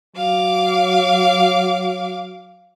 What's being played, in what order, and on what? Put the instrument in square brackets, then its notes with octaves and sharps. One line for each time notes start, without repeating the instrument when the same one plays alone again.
[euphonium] F#3 [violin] F5 D6